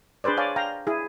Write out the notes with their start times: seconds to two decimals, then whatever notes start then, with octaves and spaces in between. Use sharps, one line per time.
0.24 D4 G#4 B4 C5 D5
0.37 C#5 D5 F5 G#5
0.56 F5 G5 A#5
0.87 E4 G#4